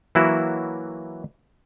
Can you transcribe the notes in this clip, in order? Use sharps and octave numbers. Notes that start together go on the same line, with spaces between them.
E3 F#3 A#3 E4 F#4